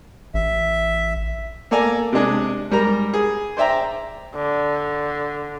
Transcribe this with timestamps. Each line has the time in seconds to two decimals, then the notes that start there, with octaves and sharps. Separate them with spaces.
0.34 A1 E5
1.71 A#3 A4 D5 G#5 A#5
2.12 C3 G#3 D4 G#4
2.71 G#2 G3 A#4 A#5
3.13 G#4
3.57 C5 D5 E5 G5 A#5
4.35 D3